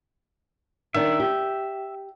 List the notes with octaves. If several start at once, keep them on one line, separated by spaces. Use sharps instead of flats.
D#3 D4 E5
G4